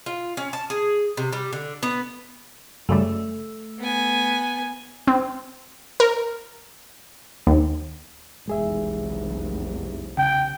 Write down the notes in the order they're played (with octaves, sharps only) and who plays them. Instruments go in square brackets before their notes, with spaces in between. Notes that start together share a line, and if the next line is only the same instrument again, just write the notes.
[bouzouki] F4
C#4
A5
G#4
C3
G3
D3
B3
[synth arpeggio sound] F#2 C#3 G3 [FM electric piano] A3
[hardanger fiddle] B3 G#5
[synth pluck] C4
A#4
D#2
[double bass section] F1 B1 E2 [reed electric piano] G#3 G#4 E5
[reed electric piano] C#3 [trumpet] G5